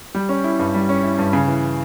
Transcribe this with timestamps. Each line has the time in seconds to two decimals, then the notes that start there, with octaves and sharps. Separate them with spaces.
0.15 G3
0.29 C#4
0.44 E4
0.59 G2
0.74 G3
0.89 C#4
1.03 E4
1.18 G2
1.33 C#3
1.48 E3